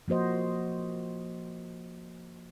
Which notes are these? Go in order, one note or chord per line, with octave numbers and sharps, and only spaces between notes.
F3 A#3 F#4 C5 D#5